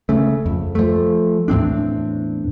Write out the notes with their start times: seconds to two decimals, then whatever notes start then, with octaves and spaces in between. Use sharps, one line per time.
0.09 C#3 A3
0.46 F2
0.75 F3 A3
1.48 E2 A2 C4 D4